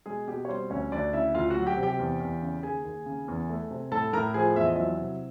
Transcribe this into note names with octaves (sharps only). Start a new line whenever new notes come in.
B2 G#3 G#4
B2 G4
C#5
G3 C4 C5
D2 C#4 C#5
D2 D4 D5
C#3 E4 E5
D2 F4 F5
F#4 F#5
F#3
G4 G5
C3
G4 G5
E2
E2
C#3
D#2 G#4 G#5
D#2
C#3
E2
A3
C3
A2 A4 A5
A2 A#4 A#5
F3 G#4 G#5
E2 E5
D#5
F#3 E4 E5
C3